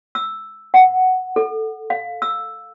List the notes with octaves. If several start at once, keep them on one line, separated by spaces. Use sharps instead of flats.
E6
F#5
A4
F5
E6